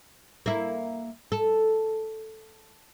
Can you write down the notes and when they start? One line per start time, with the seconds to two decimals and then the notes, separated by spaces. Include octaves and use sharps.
0.46 A#3 E4
1.32 A4